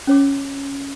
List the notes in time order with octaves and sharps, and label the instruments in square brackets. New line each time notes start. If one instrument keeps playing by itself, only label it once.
[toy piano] C#4 C#5 D6